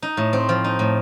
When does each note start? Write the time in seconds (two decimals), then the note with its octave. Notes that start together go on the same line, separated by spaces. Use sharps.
0.02 D#4
0.17 A2
0.33 C4
0.49 F3
0.64 D#4
0.79 A2